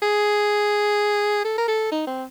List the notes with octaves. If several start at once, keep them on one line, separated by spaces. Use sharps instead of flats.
G#4
A4
A#4
A4
D#4
C4